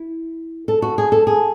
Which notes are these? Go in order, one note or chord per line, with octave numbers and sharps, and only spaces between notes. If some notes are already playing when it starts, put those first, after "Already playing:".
Already playing: E4
A4
F#4
G#4
A4
G#4